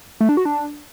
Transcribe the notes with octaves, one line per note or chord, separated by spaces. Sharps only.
A3
D4
F#4
D4